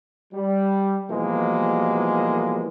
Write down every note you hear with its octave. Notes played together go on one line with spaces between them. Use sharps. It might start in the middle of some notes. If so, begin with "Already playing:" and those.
G3
B2 E3 F3 G3 G#3 A#3